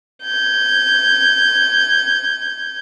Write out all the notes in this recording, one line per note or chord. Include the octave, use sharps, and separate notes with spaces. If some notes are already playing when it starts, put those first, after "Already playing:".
G6 G#6